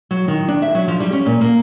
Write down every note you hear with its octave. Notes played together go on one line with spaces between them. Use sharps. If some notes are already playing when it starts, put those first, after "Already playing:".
F#3
D#3
D4
E5
F#3
F3
G3
C#4
A#2
A#3